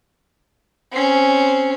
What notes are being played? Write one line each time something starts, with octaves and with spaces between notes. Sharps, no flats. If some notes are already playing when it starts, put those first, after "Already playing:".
C4 C#4